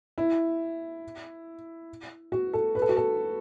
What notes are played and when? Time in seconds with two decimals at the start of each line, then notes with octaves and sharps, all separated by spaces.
0.18 E4
2.32 F#4
2.53 A4
2.75 B4
2.82 A4
2.89 F#4
2.97 A4